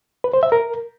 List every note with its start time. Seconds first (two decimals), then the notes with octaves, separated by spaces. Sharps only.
0.24 B4
0.33 C5
0.43 E5
0.52 A#4